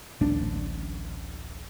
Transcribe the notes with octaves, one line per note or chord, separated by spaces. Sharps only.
D1 A1 A3 D4